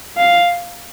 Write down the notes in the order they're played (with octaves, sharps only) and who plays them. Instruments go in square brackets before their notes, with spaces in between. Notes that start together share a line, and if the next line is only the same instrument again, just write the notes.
[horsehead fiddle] F5